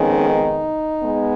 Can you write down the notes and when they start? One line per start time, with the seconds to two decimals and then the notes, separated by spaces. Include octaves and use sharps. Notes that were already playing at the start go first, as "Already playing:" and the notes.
Already playing: F2 D#3 G#3 B3 C#4
0.29 D#4
1.03 G#3 B3